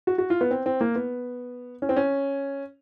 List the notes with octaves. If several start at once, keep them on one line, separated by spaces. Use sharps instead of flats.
F#4
F#4
F4
B3
C4
C4
A#3
B3
C#4
C4
C#4